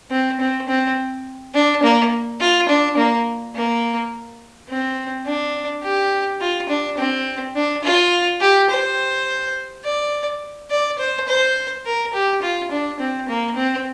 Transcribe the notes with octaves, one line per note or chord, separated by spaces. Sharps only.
C4
C4
C4
D4
A#3
F4
D4
A#3
A#3
C4
D4
G4
F4
D4
C4
D4
F4
G4
C5
D5
D5
C5
C5
A#4
G4
F4
D4
C4
A#3
C4